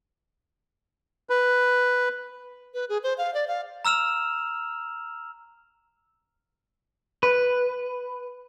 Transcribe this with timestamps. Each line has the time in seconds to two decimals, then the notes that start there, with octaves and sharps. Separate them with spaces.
1.30 B4
2.74 B4
2.89 G#4
3.03 C5
3.18 F5
3.34 D5
3.47 F5
3.85 A#5 E6 F6 E7 F7
7.23 B4